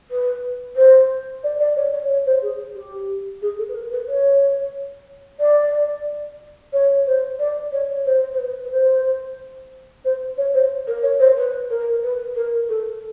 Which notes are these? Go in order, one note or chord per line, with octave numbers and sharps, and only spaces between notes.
B4
C5
D5
D5
C#5
C#5
C#5
C5
G#4
G4
G#4
A4
B4
A#4
B4
C#5
D5
C#5
C5
D5
C#5
C5
C5
B4
B4
C5
C5
C#5
C5
A#4
C#5
C5
B4
A#4
B4
A#4
A4